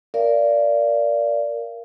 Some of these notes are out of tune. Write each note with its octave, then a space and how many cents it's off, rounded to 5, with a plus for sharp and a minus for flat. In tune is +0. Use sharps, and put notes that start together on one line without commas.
A#4 +0 D5 -15 F5 -35